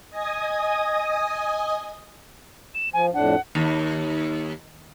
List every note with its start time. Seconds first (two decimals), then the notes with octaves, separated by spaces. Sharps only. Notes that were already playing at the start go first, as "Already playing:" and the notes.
0.10 D#5 G#5 D#6
2.75 E7
2.94 F3 G#5
3.14 F2 A2 D4 F#5
3.55 D#2